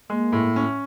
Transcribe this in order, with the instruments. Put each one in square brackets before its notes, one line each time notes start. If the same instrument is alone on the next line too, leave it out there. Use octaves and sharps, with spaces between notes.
[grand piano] G#3 [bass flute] A#3
[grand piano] A2
C#4